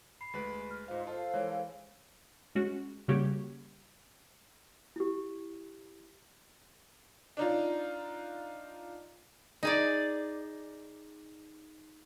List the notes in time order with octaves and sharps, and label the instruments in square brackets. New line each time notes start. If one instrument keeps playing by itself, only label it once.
[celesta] B5 C7
[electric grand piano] D2 G#3 B4
[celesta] F6
[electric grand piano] G#2 F5 [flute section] F4 C5 D#5
[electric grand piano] F4 [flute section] A4 C5 F5 [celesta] A5
[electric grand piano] E3 G#3 [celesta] C#5
[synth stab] G#3 C#4 F#4
C#3 G3 A#3 F#4 G4 C#5
[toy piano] E4 G4
[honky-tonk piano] D4 D#4 F4
[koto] D#4 G#4 D5